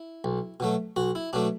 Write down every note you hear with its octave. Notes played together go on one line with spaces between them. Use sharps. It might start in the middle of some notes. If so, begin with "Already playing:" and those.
Already playing: E4
B1
B2 F#3 A3
B1 F#4
E4
B2 F#3 A3 D4